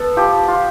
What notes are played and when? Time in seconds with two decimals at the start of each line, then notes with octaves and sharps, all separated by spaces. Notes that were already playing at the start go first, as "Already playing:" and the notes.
Already playing: B3 A4
0.17 F3 G4
0.48 F4